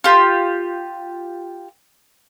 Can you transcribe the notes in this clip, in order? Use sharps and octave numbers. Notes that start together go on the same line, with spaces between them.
F4 G4